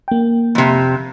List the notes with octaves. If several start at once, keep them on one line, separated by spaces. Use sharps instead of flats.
A#3 G5
F2 C3